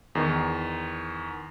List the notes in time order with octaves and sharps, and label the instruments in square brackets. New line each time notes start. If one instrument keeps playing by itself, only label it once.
[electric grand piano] E2 D#3